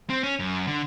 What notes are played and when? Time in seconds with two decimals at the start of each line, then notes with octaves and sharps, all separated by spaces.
0.10 C4
0.23 C#4
0.39 F#2
0.67 D3